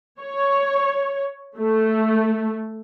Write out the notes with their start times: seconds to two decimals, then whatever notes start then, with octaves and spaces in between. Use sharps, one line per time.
0.20 C#5
1.58 A3